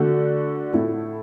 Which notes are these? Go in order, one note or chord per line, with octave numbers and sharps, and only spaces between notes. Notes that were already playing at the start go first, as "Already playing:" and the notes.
Already playing: D3 A3 F#4 A4
A2 A3 E4 A4